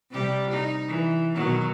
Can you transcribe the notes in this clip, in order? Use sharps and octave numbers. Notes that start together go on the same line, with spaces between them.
C3 G3 G4
D#4
E3
B2 D#3 F#3